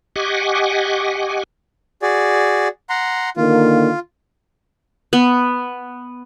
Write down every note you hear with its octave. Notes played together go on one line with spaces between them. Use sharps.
G4 D#5 F#5 G#5 C#6 D6
F#4 G#4 D5
F#5 A#5 C6
D3 D#3 A#3 F4
B3